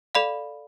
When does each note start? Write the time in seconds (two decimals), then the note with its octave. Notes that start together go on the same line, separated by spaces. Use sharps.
0.15 A4 D5 F5 B5